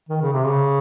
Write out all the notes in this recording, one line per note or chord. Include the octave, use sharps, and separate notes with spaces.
D#3
C#3
C3
C#3